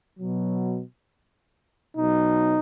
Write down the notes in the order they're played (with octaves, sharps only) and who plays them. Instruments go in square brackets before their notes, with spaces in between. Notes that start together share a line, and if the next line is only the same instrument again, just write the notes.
[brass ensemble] B2 F#3
B2 F#3 D#4